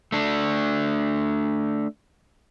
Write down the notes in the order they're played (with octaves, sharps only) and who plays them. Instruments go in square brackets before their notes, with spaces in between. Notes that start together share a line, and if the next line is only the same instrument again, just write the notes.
[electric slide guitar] A3 D4